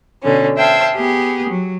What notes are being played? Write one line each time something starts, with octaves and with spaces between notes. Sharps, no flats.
B2 D3 C#4
C5 E5 F5 G5 A5 G#6
B3 G4 G#4
F#3